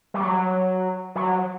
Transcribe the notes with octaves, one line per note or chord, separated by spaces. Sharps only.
G3
F#3
F#3